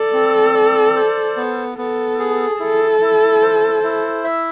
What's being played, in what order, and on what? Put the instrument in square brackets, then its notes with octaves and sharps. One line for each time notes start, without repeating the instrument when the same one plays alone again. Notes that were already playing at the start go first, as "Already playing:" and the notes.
Already playing: [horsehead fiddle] A4 [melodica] D5
[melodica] C4
D5
C5
B3
[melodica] B3 [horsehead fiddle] A4
[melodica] G#4
[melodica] E4 [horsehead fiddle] A4
[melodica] E4
C5
E4
E5